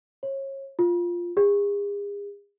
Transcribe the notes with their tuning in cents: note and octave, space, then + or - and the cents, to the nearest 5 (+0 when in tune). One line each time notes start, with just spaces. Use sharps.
C#5 -30
F4 +0
G#4 -40